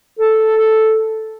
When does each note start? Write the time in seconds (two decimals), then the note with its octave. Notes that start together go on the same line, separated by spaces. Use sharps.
0.19 A4